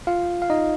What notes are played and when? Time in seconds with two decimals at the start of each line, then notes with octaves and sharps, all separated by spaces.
0.07 F4 F5
0.42 F5
0.50 D#4 D#5